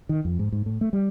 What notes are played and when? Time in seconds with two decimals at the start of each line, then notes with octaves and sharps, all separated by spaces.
0.09 D#3
0.25 F2
0.39 G#2
0.52 G#2
0.66 A2
0.81 A3
0.93 G3